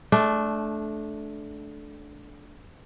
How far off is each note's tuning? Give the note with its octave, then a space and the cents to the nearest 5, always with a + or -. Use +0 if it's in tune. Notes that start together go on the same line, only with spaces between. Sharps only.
A3 -20 D4 -5